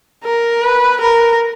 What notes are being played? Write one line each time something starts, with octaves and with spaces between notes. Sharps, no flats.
A#4
B4
A#4